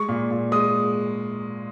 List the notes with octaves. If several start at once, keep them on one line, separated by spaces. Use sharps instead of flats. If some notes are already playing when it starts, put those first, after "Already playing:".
Already playing: G#3 C#6
A#2
A#2
G#3 D#6